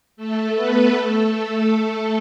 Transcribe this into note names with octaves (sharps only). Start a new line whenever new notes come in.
A3 A4
B3 B4
A3 A4